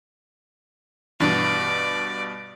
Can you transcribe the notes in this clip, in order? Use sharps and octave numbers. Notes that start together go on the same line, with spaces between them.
G2 B2 E3 D4 D5